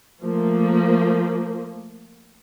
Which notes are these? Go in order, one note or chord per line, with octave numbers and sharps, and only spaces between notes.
F3 A3 A#3